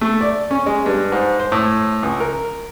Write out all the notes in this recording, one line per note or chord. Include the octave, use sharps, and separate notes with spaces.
A3
D5
C#4
G#3
G2
G#2
C5
A2
C#2
A#4